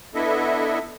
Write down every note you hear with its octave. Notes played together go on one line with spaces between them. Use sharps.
B3 D4 E4 A4 D#5 E5